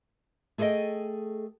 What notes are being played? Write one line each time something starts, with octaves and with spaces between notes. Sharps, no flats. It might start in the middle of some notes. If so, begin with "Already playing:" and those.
A3 G#4 A4 C5 D#5 G5